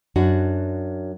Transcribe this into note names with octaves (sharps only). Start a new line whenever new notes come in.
F#2 D4 F#4